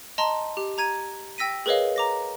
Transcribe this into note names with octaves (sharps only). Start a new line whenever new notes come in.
D#5 A5 A#5 C6
G4
A#5 G#6 D#7
G5 E6 A#6 B6 D#7
G#4 A#4 B4 C#5 D#5 F5
A#5 D6 A#6